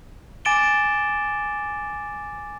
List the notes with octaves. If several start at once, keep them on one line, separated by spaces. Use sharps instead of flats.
G#5 D6 A6 D7 E7 G7